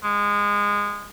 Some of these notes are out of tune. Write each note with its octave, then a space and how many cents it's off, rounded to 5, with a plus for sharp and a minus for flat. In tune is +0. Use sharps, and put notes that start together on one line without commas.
G#3 -20